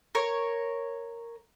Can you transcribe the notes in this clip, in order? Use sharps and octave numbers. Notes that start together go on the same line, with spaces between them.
A#4 C#5